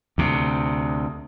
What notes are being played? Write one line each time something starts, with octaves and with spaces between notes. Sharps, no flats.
D2 C3